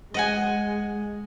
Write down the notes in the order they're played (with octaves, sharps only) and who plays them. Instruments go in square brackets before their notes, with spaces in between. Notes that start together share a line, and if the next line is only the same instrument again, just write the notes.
[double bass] G#3 [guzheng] D#5 F#5 G#5